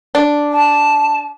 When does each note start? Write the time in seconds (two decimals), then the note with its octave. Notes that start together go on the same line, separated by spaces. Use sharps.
0.15 D4
0.52 A5